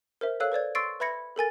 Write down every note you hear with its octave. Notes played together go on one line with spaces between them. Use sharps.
A#4 C5 E5
A4 C#5 F5 E6 F#6
B4 C5 D5 G#6
C6 C#6 E6 A6 C7 D7
B4 E5 B5 G#6 A#6 C#7
A4 A#4 G#5 A6